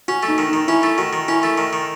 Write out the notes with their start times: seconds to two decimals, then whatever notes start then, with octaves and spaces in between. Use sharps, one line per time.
0.08 C#4 F#4
0.23 A3
0.28 D#4
0.38 D#3
0.48 D#3 D#4
0.67 C#4 E4
0.83 A3
0.98 D#3 F#4
1.13 D#3
1.28 C#4 E4
1.43 A3
1.58 D#3
1.73 D#3